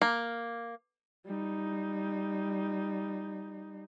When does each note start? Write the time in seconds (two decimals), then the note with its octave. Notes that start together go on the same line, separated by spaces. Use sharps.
0.02 A#3
1.26 G3 D#4